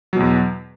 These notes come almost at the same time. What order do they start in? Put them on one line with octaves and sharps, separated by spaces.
F#3 B2 E2